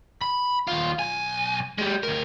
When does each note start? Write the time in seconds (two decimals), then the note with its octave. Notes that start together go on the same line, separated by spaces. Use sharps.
0.21 B5
0.68 D#2 F4
0.99 B1 G#5
1.78 G#3 G4
2.03 D2 A#4